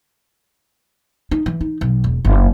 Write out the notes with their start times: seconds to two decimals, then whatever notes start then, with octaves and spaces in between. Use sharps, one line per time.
1.31 D#4
1.46 E3
1.61 D#4
1.81 B1
2.04 E1
2.25 F#1